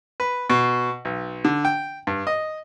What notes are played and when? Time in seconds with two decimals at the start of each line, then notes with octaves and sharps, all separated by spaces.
0.20 B4
0.50 B2
1.05 B1
1.45 D3
1.65 G5
2.07 G2
2.27 D#5